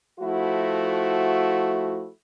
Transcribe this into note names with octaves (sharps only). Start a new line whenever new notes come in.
F3 A3 E4 F#4